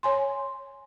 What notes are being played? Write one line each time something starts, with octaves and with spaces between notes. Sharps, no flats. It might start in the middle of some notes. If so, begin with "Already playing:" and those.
C#5 G#5 C6